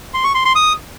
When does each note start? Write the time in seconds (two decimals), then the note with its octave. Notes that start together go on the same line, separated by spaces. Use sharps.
0.14 C6
0.24 C#6
0.35 C6
0.45 C6
0.55 D#6